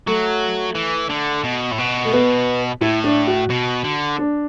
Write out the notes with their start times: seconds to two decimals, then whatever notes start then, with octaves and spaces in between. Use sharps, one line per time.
0.07 F#3 A3
0.75 E3
1.10 D3
1.43 B2
1.71 A2
1.78 B2
2.05 A3
2.13 B3
2.81 A2 E4
3.04 D4
3.27 F#4
3.50 B2
3.84 D3
4.18 D4